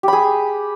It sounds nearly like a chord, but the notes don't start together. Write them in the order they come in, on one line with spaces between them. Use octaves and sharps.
G4 B5 G#4